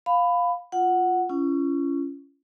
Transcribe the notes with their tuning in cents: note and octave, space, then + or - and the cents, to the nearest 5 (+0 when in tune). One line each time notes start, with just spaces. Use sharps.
F5 +10 B5 +15
F4 +0 F#5 +0
C#4 +10 F4 -45